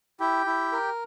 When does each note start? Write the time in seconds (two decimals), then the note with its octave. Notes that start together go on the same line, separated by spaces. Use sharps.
0.20 E4 G4 G5
0.46 E4
0.72 A#4